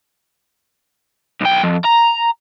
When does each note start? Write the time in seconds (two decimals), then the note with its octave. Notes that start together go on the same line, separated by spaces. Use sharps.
1.41 B1 G5
1.63 F2
1.84 A#5